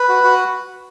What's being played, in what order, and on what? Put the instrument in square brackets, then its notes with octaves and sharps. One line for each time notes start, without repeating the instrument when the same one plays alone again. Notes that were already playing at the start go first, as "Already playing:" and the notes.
Already playing: [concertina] B4
F#4
F#4